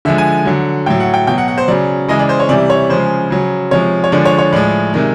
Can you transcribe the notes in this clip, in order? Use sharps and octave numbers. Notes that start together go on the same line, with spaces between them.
D3 F3 G#3 E5
G#5
D3 F#3
A2 F#3 G5
F#5
G5
B2 F#3 G5
F#5
F#5
C5
C#3 F#3 D5
C#3 E3 G#3 D#5
D5
C5
C#5
C3 E3 G3 D5
C#5
C#3 F3 G#3 C5
C#3 F#3
C3 F3 G#3 C#5
C#5
D3 F3 G#3 D5
C#5
C#5
A2 F3 G#3 D5
C3 D#3 G#3